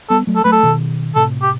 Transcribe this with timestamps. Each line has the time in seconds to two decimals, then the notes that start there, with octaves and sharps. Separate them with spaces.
0.09 G3 B3 A4
0.27 F#3 A3
0.36 A4
0.45 F#3 A3 B4
0.52 A4
0.63 B2 D#3
1.15 A2 C3 A4
1.42 G4